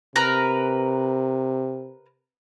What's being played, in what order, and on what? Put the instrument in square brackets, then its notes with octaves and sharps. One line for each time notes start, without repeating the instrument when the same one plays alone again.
[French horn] C3 [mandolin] A#4 B4 A#5